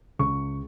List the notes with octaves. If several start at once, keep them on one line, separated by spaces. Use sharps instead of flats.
C#2 C#6